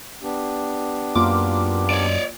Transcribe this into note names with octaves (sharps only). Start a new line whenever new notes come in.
B3 D4 G4
F#2 A#3 F4 D6
C#5 D5